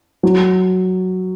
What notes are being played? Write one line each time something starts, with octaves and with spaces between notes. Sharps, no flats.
F#3